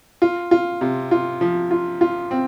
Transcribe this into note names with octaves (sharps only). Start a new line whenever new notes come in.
F4
F4
C3
F4
F3
F4
F4
C4